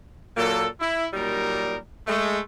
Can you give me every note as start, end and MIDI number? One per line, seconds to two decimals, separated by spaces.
0.36 0.66 46
0.36 0.66 54
0.36 0.66 58
0.36 0.66 69
0.80 1.05 64
1.13 1.76 46
1.13 1.76 54
1.13 1.76 55
1.13 1.76 63
1.13 1.76 70
2.07 2.39 56
2.07 2.39 57